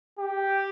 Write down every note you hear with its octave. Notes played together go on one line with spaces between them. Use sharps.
G4